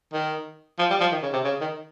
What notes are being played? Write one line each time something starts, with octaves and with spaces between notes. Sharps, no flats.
D#3
F3
G3
F3
D#3
C#3
C3
C#3
D#3